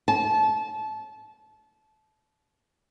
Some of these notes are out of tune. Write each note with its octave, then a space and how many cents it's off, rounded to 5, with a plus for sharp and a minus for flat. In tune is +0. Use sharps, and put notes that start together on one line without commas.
A5 -25